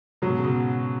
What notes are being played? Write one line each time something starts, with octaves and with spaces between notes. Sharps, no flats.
G#2 B2 F#3
C#3
B2